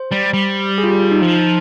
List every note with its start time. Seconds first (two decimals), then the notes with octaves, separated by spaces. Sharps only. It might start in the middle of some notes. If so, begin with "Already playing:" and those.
Already playing: C5
0.11 G3
0.33 G3
0.78 G#4
0.84 F4
0.89 G4
1.00 F4
1.11 D#4
1.22 F3